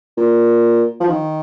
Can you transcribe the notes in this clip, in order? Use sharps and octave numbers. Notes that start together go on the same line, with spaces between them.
A#2
F3
D#3